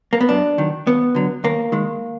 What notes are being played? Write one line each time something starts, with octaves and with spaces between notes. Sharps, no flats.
A#3
B3
F#2 D4
D#3 F#3
D#2 B3
D3 F#3
D#2 A#3
D#3 G#3